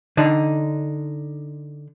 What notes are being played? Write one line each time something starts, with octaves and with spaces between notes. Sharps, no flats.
D3 D4 D#4